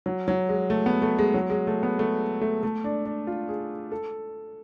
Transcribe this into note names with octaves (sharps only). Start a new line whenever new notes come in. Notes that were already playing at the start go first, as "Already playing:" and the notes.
F#3
F#3
G#3
A3
B3
A3
G#3
F#3
G#3
A3
B3
A3
A3
A3
D4
D4
F4
G#4
A4